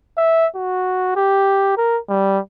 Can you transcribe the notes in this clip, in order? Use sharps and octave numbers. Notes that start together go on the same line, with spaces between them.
E5
F#4
G4
A#4
G3